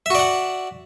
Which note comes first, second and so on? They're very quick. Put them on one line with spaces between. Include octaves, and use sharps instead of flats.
E5 F#4 D5 F#5